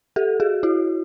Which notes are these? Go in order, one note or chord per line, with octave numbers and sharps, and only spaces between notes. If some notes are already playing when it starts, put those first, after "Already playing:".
G4 A4
F#4 G#4
E4 F#4